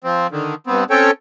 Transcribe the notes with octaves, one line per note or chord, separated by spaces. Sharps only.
F3 C4
D3 D#3
G2 B3 C4
C4 C#4 A4 C#5 G5